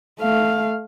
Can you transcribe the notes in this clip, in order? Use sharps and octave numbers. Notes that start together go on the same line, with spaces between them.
A3 F5